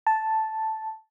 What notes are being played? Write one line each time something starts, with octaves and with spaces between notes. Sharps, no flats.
A5